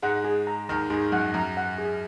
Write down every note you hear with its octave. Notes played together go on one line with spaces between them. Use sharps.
G#2 G#3 F#5
G#4
A#5
D#2 D#3 A#5
G#2 G#4
F#2 F#5
F#2 A#5
F#5
G#4